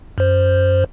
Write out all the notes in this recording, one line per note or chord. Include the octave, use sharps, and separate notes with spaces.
F#2 C5